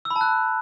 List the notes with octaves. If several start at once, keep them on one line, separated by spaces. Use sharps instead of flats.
E6
B5
A5
F#6